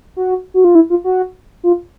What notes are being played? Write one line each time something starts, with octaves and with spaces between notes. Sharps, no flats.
F#4
F#4
F4
E4
F4
F#4
F4